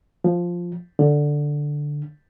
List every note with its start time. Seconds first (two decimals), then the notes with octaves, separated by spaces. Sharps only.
0.24 F3
0.99 D3